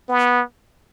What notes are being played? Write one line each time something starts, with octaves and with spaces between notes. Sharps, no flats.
B3